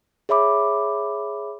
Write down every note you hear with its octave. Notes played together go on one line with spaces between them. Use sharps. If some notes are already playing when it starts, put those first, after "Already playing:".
G#4 C#5 E5 B5 D6